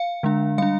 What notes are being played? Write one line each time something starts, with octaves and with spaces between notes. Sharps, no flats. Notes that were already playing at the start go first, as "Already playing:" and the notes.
Already playing: F5
D3 G#3 D4
G3 D4 F5